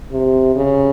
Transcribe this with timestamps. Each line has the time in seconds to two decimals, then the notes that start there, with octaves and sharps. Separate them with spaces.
0.12 C3
0.56 C#3